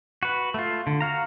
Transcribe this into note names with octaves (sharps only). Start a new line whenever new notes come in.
F#4 B4
A3 F4
D3
F#4 F5 A#5